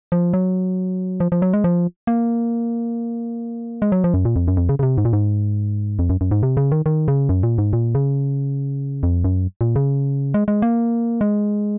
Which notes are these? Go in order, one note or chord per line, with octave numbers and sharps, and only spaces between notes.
F3
F#3
F3
F3
F#3
G#3
F3
A#3
G#3
F#3
F3
F#2
A#2
F2
F#2
F2
C#3
C#3
C3
G#2
A#2
G#2
F2
F#2
F#2
G#2
C3
C#3
D#3
D#3
C#3
F#2
A#2
G#2
A#2
C#3
F2
F#2
A#2
C#3
G#3
G#3
A#3
G#3